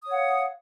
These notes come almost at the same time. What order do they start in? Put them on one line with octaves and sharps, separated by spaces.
D#6 C#5 F#5 F5